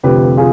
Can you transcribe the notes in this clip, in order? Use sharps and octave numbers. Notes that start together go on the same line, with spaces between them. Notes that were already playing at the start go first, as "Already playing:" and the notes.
F1 F2 D3 G4 B4
F4 G#4